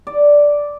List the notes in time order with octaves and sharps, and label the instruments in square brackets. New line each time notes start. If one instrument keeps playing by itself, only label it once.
[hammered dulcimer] D5